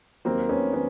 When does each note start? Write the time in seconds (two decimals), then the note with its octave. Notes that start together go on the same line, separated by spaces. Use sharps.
0.25 D#2 D#3 F#3 A#3 C4
0.49 B3 C#4
0.73 D#3 B3 C#4